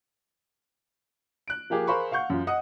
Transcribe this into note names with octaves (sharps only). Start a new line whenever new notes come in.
F#6 D7
F3 A#3 G4 G#4
G#4 A#4 C5 F5 B5 C#6
F5 F#5 C#6 G6
F#2 F4
D#5 F#5 D#6